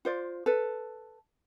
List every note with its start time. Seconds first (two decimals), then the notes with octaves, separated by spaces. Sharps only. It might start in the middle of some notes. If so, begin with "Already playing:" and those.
0.05 F4 C5 D5
0.46 A4 B4